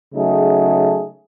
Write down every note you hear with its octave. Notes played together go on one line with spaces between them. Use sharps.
C#3 F#3 A3 D#4 G#4